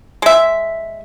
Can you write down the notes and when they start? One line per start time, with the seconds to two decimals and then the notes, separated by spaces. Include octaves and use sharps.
0.22 G#3 E5